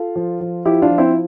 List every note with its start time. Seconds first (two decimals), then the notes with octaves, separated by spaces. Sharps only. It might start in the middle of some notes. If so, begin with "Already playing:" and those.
Already playing: F4 A4
0.16 F3
0.41 F3
0.65 F3 E4 G4
0.82 D4 F4
0.90 F3
0.98 C4 E4